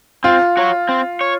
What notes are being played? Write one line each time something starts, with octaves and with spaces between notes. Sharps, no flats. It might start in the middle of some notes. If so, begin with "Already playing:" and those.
C4 F4
F#4 C#5
C4
C#5